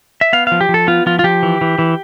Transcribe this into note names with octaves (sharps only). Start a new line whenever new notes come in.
E5
B3 F5
F3 F5
G4
F3
A4
B3 F4
F3 F4
F4
F3 G4
E3
E3
E3